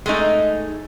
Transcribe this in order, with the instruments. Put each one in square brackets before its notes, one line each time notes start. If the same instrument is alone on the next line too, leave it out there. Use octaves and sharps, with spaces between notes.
[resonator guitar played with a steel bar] G#3 A3 D#4